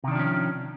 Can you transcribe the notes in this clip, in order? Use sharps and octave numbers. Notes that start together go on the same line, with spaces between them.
C3 D#3 F3 C#4 D4